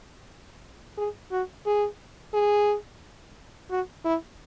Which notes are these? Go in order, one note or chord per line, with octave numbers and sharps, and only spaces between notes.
G#4
F#4
G#4
G#4
F#4
E4